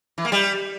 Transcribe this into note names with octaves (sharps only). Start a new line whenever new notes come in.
E3
A#3
G3